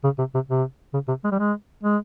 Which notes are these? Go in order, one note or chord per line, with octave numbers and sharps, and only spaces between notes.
C#3
C3
C3
C3
C#3
C3
G#3
G3
G#3
G#3